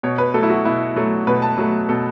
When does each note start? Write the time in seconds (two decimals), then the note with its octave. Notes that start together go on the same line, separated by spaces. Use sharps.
0.03 B2 C#5
0.18 B4
0.34 F#3 A3 A4
0.43 E4
0.50 F#4
0.65 B2 E4
0.96 F#3 A3
1.27 B2 B4
1.42 A5
1.58 F#3 A3
1.89 B2 A4